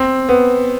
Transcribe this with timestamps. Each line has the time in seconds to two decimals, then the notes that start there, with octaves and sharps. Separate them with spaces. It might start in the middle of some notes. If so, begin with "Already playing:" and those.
Already playing: C4
0.29 B3